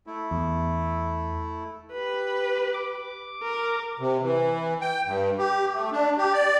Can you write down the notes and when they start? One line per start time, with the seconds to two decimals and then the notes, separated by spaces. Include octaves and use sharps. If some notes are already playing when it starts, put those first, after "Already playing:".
0.07 A3 E4
0.31 E2
1.92 G4 B4
2.74 D6
3.43 A#4
3.99 C3
4.22 E3
4.81 G5
5.06 G2
5.39 G4
5.74 A3
5.92 D4
6.18 G4
6.33 D5